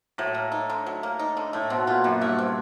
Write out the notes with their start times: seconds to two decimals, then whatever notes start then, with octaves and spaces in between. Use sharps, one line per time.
0.18 A2 F#3
0.35 A#3
0.52 D#4
0.70 D3
0.86 F#3
1.03 A#3
1.19 D#4
1.37 D3
1.53 A2 A3
1.70 B2 C4
1.87 A#2 F4
2.04 F#2 E3
2.21 G2 A3
2.39 C4